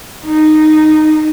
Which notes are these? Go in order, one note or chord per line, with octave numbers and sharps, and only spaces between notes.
D#4